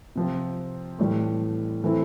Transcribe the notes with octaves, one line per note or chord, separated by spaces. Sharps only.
C3 F3 C4
A2 E3 G3
E3 A3 C4 E4